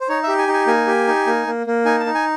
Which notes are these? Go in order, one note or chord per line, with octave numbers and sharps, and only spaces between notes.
C5
D#4 C#5
G4 E5
G#5
D#4
G#5
A#3 G#5
G4
D#4
A#3
A#3
A#3
D#4 G#5
A5
D#4
G#5